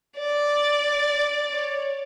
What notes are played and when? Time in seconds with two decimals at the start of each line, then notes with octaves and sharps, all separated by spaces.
0.18 D5
1.51 C#5